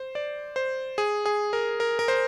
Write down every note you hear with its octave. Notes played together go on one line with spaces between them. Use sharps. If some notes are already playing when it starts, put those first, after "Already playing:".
Already playing: C5
D5
C5
G#4
G#4
A#4
A#4
A#4
C5